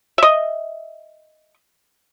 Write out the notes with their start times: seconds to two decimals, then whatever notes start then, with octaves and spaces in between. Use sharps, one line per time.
0.18 D#5 E5